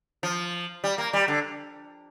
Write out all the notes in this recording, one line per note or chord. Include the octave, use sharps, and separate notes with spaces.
F3
G3
A#3
G3
D3